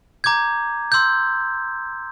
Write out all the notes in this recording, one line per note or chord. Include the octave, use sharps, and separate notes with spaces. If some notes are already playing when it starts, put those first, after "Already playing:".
A#5 D6 G6 G#6
C6 E6 G6